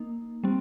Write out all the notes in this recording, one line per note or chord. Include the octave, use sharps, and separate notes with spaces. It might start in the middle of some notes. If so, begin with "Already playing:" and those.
Already playing: A#3 D#4
G3 C4